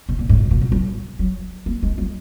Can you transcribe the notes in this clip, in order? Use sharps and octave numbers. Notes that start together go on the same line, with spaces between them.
B2
A#2
G#2
A#2
A#2
B2
F#3
F#3
A#3
G#3
F#3